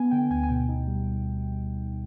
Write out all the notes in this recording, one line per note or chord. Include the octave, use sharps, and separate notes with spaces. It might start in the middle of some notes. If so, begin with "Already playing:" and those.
Already playing: B3 G#5
D3 G5
D2 G#5
G#5
B2 G5
D#4
G3